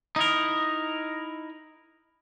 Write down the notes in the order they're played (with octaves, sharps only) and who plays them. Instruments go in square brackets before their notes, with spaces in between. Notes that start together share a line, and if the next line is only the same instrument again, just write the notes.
[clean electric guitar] D#4 E4 A#4